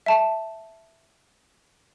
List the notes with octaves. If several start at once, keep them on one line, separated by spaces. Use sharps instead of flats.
E5 A5